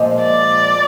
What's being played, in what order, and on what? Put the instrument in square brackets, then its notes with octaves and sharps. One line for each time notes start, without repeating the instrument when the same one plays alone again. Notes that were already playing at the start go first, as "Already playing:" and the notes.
Already playing: [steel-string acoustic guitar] A#2 F3 G#3
[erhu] D5